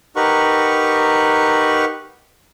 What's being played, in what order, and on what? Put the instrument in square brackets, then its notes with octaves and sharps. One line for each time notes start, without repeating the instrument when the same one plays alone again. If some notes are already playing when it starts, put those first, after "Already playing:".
[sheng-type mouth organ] D#4 G4 A#4 B4 F#5 C#6